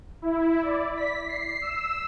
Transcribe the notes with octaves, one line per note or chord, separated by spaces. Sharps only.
E4
D5
B6
C7
E6